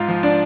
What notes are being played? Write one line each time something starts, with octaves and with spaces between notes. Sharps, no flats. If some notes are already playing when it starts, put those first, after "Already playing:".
Already playing: G#2 F4 F5
F3
D4 D5